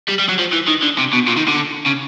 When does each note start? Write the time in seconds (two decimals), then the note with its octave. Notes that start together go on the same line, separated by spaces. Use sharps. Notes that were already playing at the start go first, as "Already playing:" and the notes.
0.08 G3
0.19 G3
0.29 F#3
0.39 F3
0.53 E3
0.68 D#3
0.83 D3
0.98 C3
1.13 B2
1.27 A#2
1.37 D#3
1.48 D3
1.86 C#3